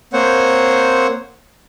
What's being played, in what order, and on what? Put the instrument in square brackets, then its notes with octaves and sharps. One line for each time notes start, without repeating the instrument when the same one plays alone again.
[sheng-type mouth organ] A#3 C4 C5 C#5 F#5